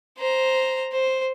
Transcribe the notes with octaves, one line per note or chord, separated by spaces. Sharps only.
C5 A#5
C5